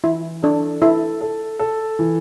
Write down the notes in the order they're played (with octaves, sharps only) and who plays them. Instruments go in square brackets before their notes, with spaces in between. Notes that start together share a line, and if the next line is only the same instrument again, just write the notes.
[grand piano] E3 [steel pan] E4
[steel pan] D4 [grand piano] A4
[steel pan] E4 [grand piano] A4
[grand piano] A4
A4
E3